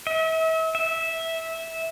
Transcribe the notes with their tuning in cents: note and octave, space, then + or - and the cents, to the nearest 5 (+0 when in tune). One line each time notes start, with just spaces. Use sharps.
E5 -40
E5 -15